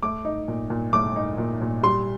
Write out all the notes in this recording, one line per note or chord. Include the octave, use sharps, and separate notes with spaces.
A3 D6
D#4
A#2
A#2
A3 D6
D#4
A#2
A#2
G3 C6